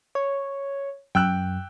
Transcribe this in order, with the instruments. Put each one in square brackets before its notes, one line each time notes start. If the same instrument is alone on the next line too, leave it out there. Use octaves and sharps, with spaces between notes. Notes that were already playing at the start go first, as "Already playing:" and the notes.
[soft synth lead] C#5
[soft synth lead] F#2 [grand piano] G5 E6 F#6